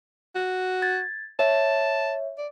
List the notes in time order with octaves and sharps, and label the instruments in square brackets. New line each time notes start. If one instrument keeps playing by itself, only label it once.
[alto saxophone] F#4
[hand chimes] G#6 A6
[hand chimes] C#5 E5 [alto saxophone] A5
[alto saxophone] D5